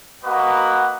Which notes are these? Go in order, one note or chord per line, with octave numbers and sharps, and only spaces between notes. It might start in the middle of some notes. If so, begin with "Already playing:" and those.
A#3 F#4 B4 D#5 F#5